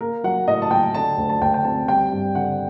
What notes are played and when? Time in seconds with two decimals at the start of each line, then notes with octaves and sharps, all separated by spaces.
0.01 A#3 A#4
0.24 F#3 F#5
0.48 A2 D#5
0.62 A5
0.71 F#3 G5
0.94 D3 A5
1.18 D2
1.29 A5
1.41 D2 G5
1.54 G5
1.64 C4 A5
1.88 G3 G5
2.11 G2
2.35 D3 F#5